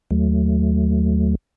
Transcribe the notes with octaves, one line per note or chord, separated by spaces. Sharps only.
D#2 F#3 A3